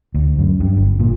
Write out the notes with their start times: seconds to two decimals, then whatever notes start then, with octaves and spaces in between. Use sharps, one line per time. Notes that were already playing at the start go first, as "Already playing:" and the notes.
0.14 D2
0.38 F#2
0.60 G2
0.77 G1
0.99 A#2